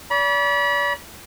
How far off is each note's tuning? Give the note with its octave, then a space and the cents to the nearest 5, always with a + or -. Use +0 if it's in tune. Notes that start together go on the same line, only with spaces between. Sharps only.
D5 -40 B5 -30